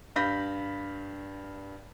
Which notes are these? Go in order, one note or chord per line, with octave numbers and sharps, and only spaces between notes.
G2 F5 B5 G6 A#6 B6